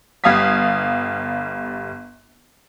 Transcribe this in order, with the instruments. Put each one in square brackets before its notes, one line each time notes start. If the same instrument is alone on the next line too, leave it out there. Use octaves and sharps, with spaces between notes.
[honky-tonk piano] G1 G3 F5 D#6 G#6 B6